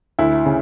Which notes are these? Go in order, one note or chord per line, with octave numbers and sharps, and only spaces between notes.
D2 E4
C#3